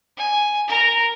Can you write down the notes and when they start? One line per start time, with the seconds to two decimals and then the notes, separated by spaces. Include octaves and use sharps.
0.17 G#5
0.68 A#4 A#5